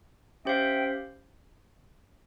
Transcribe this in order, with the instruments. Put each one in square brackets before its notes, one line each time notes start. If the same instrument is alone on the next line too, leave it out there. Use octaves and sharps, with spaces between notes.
[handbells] C#4 G4 C5 F5 [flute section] E5 G5